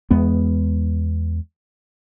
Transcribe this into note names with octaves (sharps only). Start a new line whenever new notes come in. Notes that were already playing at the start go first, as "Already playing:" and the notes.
E2 G#3 B3